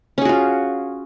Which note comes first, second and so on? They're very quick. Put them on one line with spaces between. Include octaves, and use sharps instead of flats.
C#4 G#4 F#4 F4